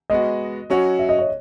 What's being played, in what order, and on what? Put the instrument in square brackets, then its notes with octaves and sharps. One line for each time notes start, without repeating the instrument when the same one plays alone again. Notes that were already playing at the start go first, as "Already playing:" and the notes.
[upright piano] G#3 B3 F#4 [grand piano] D#5
[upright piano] F#3 C#4 F#4
[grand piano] E5
D#5
C#5